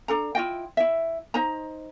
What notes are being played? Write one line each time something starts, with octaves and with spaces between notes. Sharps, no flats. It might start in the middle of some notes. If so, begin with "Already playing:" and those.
D4 A4 A#5
E4 F4 D#5 G5
E4 E5
D#4 C5 D#5 A#5